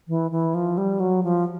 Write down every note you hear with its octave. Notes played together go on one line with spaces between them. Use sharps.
E3
E3
F3
G3
F#3
F3